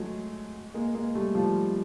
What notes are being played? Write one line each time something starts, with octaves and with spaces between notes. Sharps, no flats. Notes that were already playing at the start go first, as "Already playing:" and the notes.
Already playing: F#3 G#3 A3
G#3 A#3
G#3 A#3
G3 A3
F3 G3